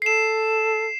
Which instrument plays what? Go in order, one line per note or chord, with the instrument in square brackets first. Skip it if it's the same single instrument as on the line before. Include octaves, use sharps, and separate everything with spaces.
[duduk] A4 [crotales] C7 E7